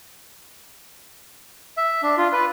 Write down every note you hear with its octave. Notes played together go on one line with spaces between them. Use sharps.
E5
D4
F4
B4